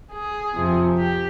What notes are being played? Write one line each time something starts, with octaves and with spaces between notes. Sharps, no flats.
G#4
F2 C3 F3
G4